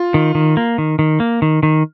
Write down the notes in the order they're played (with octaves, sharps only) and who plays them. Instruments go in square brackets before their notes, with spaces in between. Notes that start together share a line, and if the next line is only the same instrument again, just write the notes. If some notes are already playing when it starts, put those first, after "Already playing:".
Already playing: [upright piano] F4
[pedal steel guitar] D#3
D#3
A#3
D#3
D#3
A#3
D#3
D#3